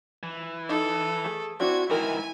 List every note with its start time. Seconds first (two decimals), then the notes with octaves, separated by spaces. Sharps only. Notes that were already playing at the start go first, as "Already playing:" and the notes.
0.23 E3
0.69 D#4 A4
1.24 A3 G#4
1.60 C4 D4 E4 F#4 G#6
1.90 G#2 D#3 E3 E4 A#4 G#5